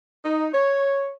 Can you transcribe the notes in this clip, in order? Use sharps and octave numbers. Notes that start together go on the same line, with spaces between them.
D#4
C#5